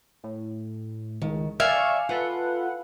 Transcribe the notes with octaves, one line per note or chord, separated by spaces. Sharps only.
A2
C#2 D#3
D5 E5 F5 G#5 C#6
F4 A4 B4 F#5